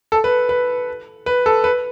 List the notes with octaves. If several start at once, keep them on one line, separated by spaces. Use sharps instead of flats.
A4
B4
B4
B4
A4
B4